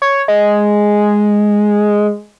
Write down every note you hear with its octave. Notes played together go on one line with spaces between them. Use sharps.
C#5
G#3